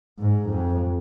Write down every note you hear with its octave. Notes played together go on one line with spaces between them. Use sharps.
G#2
F2